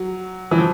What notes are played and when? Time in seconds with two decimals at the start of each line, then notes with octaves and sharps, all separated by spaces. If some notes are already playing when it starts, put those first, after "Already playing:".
Already playing: F#3
0.51 E3
0.58 F3